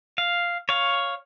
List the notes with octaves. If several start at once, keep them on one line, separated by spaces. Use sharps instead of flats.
F5
C#5 F5